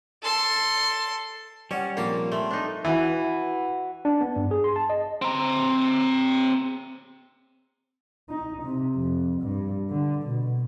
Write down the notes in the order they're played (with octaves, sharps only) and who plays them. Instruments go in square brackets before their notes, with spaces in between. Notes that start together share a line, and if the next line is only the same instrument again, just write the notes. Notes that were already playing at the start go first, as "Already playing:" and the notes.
[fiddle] A4 C6
[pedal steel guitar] G3 [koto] C#4 [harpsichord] D5 F#5
[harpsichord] A#1 C3 A5 [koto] A#3
[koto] A3 [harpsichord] C4
[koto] D4 D#4
[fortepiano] E3 [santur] F#4 B4 C#5
[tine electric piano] D4
B3
G2
G#4
C6
A5
D#5
[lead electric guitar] C4 A#5
[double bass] D#4
C3
F2
G2
D3
B2